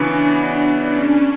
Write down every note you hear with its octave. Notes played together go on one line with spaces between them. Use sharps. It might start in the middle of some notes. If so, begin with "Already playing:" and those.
Already playing: C#3 E3 B3 D4 F#4
D4
C#4